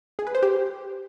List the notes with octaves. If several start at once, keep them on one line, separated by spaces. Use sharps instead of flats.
G#4
B4
C5
G4